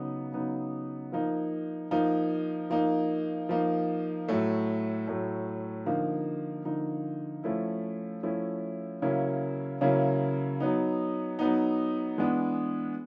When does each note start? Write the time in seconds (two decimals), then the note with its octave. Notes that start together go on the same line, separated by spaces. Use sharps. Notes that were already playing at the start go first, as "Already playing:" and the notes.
Already playing: C#3 F#3 B3 D#4
0.33 C#3 F#3 B3 D#4
1.12 F3 A#3 D#4
1.91 F3 A#3 D#4
2.70 F3 A#3 D#4
3.49 F3 A#3 D#4
4.28 A2 F#3 A3
5.07 A2 F#3 A3
5.86 D3 F3 A#3 D#4
6.65 D3 F3 A#3 D#4
7.43 F3 A3 C#4 E4
8.23 F3 A3 C#4 E4
9.02 C#3 F#3 A#3 C#4 E4
9.81 C#3 F#3 A#3 C#4 E4
10.60 F#3 B3 D#4
11.39 F#3 B3 D#4
12.18 E3 G#3 B3 D4